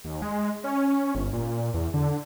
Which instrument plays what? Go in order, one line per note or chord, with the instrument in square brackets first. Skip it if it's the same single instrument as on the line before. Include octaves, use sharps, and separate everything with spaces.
[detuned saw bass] D#2
G#3
C#4
G1
A#2
E2
D3